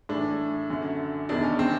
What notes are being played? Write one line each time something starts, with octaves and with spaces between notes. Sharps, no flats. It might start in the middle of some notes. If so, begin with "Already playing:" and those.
A2 E3 D4
F#2 D3
E2 C3 D#3 D4
C#4
C4